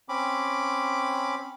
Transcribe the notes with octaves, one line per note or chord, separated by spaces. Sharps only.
C4 C#4 B5 D6